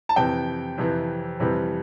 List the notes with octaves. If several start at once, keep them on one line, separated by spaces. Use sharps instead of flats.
A5
F2 C3 E3 G5
F2 C3 E3
F2 C3 E3 G3